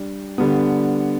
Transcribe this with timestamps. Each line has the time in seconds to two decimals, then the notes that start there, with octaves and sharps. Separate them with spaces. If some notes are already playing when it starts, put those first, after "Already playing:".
Already playing: G3 D4 G4
0.38 D3 G3 B3